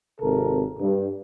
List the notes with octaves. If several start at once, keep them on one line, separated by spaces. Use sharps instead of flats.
G#1 C3 A4 A#4
G2